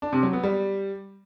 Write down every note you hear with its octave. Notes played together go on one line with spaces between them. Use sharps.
D4
C3
F#3
B3
G3